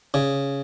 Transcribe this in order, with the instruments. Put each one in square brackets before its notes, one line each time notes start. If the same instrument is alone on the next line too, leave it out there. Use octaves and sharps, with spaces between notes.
[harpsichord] C#3